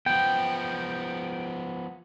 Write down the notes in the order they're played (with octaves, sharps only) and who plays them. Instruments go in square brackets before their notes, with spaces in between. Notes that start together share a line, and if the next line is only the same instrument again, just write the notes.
[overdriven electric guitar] F3 B3 [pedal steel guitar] G5